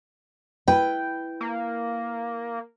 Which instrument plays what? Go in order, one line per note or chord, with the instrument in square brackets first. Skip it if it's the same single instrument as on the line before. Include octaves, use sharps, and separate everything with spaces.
[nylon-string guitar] E4 B4 [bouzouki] G5
[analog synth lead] A#3